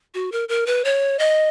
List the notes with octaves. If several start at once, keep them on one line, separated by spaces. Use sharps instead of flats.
F#4
A#4
A#4
B4
C#5
D#5